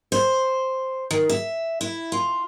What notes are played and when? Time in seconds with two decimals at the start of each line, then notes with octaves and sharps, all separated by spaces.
0.12 C5
1.11 D#3
1.29 E5
1.81 E4
2.12 F4